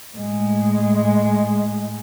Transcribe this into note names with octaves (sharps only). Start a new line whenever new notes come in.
A2 G#3